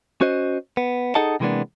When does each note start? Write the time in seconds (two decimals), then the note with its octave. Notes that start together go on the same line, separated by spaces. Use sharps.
0.21 C#4 F#4 C5 D#5
0.77 B3
1.15 D#4 G#4 A4 D#5 F#5 A5
1.40 C3 E3 G#3 A#3 B3 D4